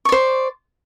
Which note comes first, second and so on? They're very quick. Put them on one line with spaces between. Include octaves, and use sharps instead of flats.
C#6 D5 C5